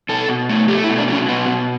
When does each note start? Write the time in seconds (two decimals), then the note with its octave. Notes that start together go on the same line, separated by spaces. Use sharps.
0.09 B2 A4
0.29 B2
0.49 A3
0.68 A3 G4
0.84 E4
0.88 B2
0.98 D4
1.08 F#3 C#4
1.28 B2 B3
1.48 B2